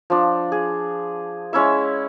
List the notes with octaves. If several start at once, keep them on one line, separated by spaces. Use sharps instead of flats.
F3 D4
G#4
G#3 C#4 E4 E5